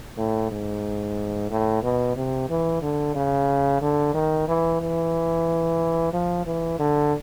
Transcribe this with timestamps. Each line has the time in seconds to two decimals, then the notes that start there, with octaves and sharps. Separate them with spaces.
0.18 A2
0.51 G#2
1.51 A2
1.83 B2
2.16 C3
2.49 E3
2.82 D3
3.15 C#3
3.81 D3
4.14 D#3
4.48 E3
4.81 E3
6.13 F3
6.46 E3
6.79 D3